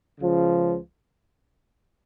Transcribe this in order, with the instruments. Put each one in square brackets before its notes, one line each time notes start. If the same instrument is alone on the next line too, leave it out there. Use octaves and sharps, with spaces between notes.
[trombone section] C#2 C#3 F3